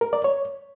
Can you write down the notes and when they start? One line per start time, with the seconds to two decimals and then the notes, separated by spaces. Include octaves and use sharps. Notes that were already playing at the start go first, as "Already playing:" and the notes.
0.01 A#4
0.13 D5
0.24 C#5